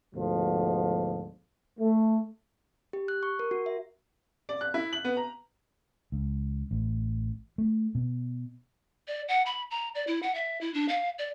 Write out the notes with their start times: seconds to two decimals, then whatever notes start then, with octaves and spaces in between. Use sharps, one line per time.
0.15 D2 G#2 B2 D3 F3
1.79 A3
2.93 G4
3.08 F#6
3.23 C#6
3.39 A#4
3.51 F#4
3.66 E5
4.49 D5
4.61 F#6
4.74 E4
4.93 F#7
5.04 B3
5.17 A#5
6.12 C#2
6.71 A1
7.58 A3
7.95 B2
9.08 D5
9.28 F#5
9.46 B5
9.71 A#5
9.95 D5
10.07 E4
10.23 F#5
10.35 E5
10.61 E4
10.74 D4
10.89 F5
11.19 D5